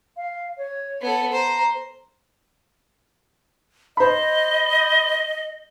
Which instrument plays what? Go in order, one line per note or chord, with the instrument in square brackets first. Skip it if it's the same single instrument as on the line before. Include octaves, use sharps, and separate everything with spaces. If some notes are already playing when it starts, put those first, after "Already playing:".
[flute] F5
C#5
[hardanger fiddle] B3 A4
[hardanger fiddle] C5 [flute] A#5
[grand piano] C5 B5 [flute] D#5